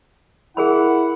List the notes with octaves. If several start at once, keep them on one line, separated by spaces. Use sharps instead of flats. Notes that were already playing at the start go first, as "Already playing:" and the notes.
E4 G#4 A#4 F#5 B5